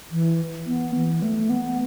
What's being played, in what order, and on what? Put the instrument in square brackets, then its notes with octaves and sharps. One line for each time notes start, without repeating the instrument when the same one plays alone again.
[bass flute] E3
B3
E3
A3
B3